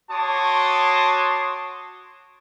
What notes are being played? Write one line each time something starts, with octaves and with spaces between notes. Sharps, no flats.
F#4 C#5 A5 C6 D6 D#6